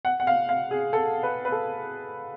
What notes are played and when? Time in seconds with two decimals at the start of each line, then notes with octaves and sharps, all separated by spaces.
0.05 F#5
0.20 F#5
0.27 F5
0.49 F5
0.71 G#4
0.93 A4
1.23 B4
1.45 B4
1.52 A4